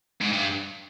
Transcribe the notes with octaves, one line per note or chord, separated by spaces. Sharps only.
G#2
G2